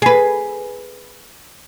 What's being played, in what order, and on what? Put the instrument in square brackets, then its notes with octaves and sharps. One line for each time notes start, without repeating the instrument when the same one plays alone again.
[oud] G#4 B4